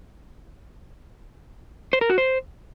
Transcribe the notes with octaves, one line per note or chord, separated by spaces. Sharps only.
C5
A#4
F#4
C5